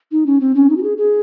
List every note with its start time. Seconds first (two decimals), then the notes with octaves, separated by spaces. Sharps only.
0.12 D#4
0.26 C#4
0.40 C4
0.55 C#4
0.70 D#4
0.77 F#4
0.83 G#4
0.98 G#4